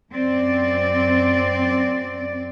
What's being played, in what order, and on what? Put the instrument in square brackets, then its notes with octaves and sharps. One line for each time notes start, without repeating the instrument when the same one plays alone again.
[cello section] F#2 C4 D5